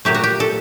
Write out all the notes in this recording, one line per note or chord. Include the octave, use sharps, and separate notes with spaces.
A#2 F#3 A3 G4
F#4
G4
A4